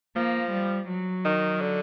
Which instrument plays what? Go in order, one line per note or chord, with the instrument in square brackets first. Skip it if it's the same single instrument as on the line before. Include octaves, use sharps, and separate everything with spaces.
[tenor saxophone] F3 [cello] A#3
[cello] G3
F#3
[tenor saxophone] D#3
D3